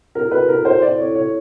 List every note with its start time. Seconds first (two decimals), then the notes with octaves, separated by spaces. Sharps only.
0.15 C4 E4 A4 A#4
0.31 B4
0.49 A#4
0.65 C5
0.82 C4 E4 A4 D5
0.99 C#5
1.15 C#5